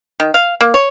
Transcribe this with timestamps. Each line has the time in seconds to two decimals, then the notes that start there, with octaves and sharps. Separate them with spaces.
0.20 D#3
0.34 F5
0.61 A#3
0.74 C#5